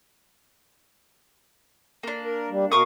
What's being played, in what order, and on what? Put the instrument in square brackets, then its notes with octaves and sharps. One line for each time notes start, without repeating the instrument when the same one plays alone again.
[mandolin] A#3 D4
[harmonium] A#4
G3
[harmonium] B2 A#4 [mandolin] F5 C#6 D#6